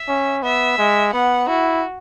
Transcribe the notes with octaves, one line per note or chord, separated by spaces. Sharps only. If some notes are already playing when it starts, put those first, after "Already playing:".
Already playing: E5
C#4
B3 E5
G#3
B3 F#5
E4 F#4